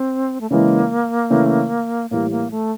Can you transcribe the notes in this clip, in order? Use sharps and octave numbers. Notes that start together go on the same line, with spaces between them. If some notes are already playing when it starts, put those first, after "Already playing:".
Already playing: C4
A3
C#3 E3 G#3 A#3
C#3 E3 A3
A2 E3 G3 A#3
A#3
A3